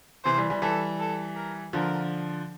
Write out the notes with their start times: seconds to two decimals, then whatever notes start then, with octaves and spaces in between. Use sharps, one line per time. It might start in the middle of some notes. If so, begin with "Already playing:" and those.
0.25 C3 E3 C5
0.38 E3 G3
0.50 E3 G3
0.62 E3 G3 A4
1.00 A4
1.36 A#4
1.73 D3 F3 A#4